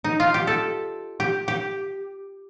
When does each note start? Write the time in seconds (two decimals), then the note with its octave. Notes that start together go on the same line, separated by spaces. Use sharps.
0.04 D#4
0.20 F4
0.34 G4
0.47 A4
1.20 G4
1.48 G4